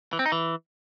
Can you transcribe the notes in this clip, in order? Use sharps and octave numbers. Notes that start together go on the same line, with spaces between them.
E3
C4
D#4
E3